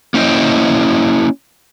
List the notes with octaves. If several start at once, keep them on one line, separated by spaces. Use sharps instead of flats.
A#3 C#4 E4 C5 D#5 G5